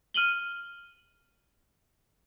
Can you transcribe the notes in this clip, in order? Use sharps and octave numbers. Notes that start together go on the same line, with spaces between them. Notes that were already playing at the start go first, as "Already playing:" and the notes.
F6 D#7 F#7 G7